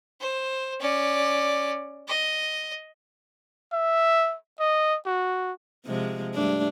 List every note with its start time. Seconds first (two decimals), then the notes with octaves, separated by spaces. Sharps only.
0.20 C5
0.80 C#4 D5
2.08 D#5
3.73 E5
4.60 D#5
5.06 F#4
5.86 C3 F3 G#3
6.34 G2 A3 D4